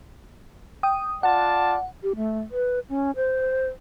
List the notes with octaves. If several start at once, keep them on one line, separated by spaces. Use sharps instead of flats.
G5 D#6
F4 D5 F#5 A5
G4
A3
B4
C#4
C5